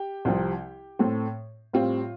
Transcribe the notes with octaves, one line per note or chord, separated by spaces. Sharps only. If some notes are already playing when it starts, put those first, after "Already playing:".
Already playing: G4 G5
C2 C3 F3 C4
A2 A3 C4
A2 G3 C4 F4 F5